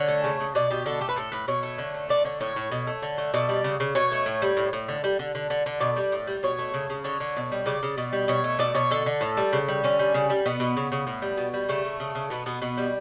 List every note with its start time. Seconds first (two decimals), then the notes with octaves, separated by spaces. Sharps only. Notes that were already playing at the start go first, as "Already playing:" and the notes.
Already playing: D3 C#5
0.08 A3
0.24 C#3
0.40 C#3
0.55 B2 D5
0.70 B2 G4
0.86 D3 A4
1.01 A3 G4
1.09 B4
1.16 A2 A4
1.32 A2 B4
1.48 B2 C#5
1.63 A3
1.78 D3
1.94 A3
2.09 D3 D5
2.25 D3 C#5
2.40 A2 C#5
2.56 A2
2.71 B2
2.87 A3
3.02 D3
3.18 A3
3.34 B2 D5
3.49 G3
3.64 C#3
3.80 C#3
3.95 B2 C#5
4.11 A3
4.26 A2
4.42 G3
4.57 A2
4.73 A2
4.88 D3
5.04 G3
5.19 D3
5.35 D3
5.50 D3
5.66 D3
5.80 B2 D5
5.96 G3
6.12 A2
6.27 G3
6.43 B2 C#5
6.59 A3
6.74 C#3
6.90 C#3
7.04 D3 C#5
7.20 D3
7.36 B2
7.52 G3
7.66 C#3 D5
7.83 C#3
7.97 B2
8.13 G3
8.28 B2 C#5
8.44 A3
8.59 B2 D5
8.74 B2 C#5
8.91 D3 A4
9.06 D3
9.21 A2
9.37 G3
9.53 C#3
9.68 G3
9.84 D3 C#4
9.99 G3
10.14 C#3
10.30 G3
10.46 B2 B3
10.60 B2
10.77 C#3
10.92 C#3
11.07 A2
11.22 G3
11.37 B2
11.54 G3
11.69 C#3 A3
11.85 C#3
12.00 C#3
12.15 C#3
12.30 B2 B3
12.46 B2 B3
12.62 B2 B3
12.77 G3